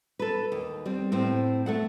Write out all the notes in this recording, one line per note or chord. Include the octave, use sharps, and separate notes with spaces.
A4 B4
D#2
G3 C4
A2 C4 C5
A3 A4 F#5